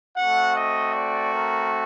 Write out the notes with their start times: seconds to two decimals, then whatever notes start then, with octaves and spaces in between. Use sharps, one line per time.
0.16 A3 C4 F#4 F#5
0.55 D#5
0.95 D5
1.34 A#4